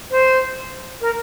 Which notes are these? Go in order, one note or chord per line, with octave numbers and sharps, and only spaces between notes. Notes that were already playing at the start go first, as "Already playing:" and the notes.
C5
A#4